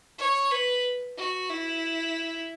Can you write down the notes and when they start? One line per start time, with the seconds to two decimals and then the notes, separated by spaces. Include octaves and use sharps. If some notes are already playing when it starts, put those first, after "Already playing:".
0.18 C#5
0.51 B4
1.17 F#4
1.49 E4